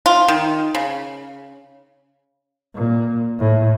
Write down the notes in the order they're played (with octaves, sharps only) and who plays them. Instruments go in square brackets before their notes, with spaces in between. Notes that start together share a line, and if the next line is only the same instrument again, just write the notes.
[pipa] F4
D#3
C#3
[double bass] A#2
A2